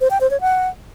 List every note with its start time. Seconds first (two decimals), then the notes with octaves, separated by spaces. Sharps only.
0.01 C5
0.11 G5
0.21 C5
0.31 C#5
0.41 F#5